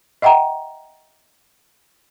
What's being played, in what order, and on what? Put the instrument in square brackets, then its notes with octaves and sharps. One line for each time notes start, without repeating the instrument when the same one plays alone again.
[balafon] D#5 E5 F#5 G5 A#5